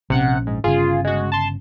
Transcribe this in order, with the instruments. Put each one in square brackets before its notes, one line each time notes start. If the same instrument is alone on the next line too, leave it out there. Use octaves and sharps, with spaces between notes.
[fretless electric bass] A#1 C#4 [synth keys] C3 F#5 C#7
[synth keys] G#2
[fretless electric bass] G1 C#3 [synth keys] F4 G#4
[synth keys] G#3 F#4
A5 C6